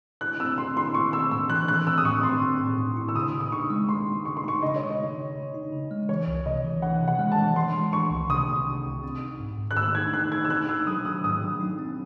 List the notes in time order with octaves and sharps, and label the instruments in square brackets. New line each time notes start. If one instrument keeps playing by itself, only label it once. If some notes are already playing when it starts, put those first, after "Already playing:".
[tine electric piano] E4 [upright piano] F#6
[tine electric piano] C4 [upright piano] E6
[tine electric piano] C4 [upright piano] C6
[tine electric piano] E4 [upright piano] C6
[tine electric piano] C4 [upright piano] C#6
[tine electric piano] C4 [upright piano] E6
[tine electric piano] A2 [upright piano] E6
[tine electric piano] E3 [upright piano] F#6
[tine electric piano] E3 [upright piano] F#6
[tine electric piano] C4 [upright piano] E6
[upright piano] D#6
[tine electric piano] A2 [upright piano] C#6
[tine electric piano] C4 [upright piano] C6
[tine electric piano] C4
A2
A2
E4
[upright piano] E6
[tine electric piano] C#3 [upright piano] D#6
[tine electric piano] C#3
[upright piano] D#6
[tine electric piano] D#4 [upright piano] C#6
[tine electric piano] G#3
[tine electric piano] G#3 [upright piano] C6
[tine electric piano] D#4
[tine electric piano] C#3 [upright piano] C#6
[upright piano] C6
[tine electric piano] D#4 [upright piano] C#6
[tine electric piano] C#3 [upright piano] D#5
[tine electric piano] G#3 [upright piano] C#5
[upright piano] D#5
[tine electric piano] D#4
C#3
C#3
D#4
C#3
G#3
[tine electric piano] E3 [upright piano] C#5
[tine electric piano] C2
[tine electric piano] C3 [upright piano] D#5
[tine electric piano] E3
[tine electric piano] E3 [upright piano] F#5
[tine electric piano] C3
[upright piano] F#5
[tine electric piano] G#3
[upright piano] A5
[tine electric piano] E3
[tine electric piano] E3 [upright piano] C6
[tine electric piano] G#3
[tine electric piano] E3 [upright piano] C#6
[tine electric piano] C2
[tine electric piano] C3 [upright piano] D#6
[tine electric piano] C3
C3
C2
C4
D#4
G#2
G#2
[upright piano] F#6
[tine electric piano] G#2 [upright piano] E6
[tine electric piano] D#4 [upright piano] G#6
[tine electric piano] D#4 [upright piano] F#6
[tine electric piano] D#4 [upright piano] G#6
[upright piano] E6
[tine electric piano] D#4 [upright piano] F#6
[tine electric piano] D#4 [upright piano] E6
[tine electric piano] F#3 [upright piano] D#6
[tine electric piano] F#3 [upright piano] D#6
[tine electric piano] G#2 [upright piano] D#6
[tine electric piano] F#3
D#4
C4